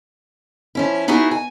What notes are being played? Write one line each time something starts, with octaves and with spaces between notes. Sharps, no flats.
F3 C#4 E4
B3 D#4 E4 F#4 G#4
G#5